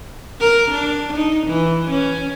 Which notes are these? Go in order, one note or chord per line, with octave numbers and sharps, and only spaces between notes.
A#4
D4
D#4
E3
C#4